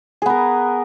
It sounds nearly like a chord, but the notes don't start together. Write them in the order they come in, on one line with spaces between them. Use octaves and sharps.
G#4 B3 A#4